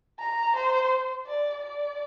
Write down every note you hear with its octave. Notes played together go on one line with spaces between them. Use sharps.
A#5
C5
D5
D5